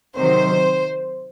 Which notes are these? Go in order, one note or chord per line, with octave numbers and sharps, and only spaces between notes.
C3 D#3 F#3 C5